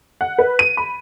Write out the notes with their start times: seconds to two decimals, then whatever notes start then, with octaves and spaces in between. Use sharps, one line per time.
0.21 F#5
0.38 B4
0.59 D#7
0.77 B5